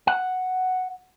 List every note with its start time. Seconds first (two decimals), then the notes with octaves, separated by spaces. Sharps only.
0.07 F#5